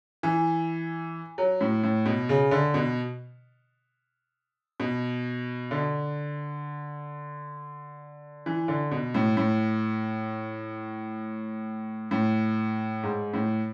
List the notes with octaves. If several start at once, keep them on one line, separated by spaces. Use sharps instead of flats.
E3
F#3
A2
A2
B2
C#3
D3
B2
B2
D3
E3
D3
B2
A2
A2
A2
G#2
A2